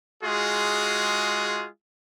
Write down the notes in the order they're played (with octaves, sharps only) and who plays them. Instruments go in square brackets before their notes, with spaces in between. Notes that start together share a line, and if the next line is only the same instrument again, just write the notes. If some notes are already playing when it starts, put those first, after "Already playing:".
[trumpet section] G#3 F4 F#4 G#4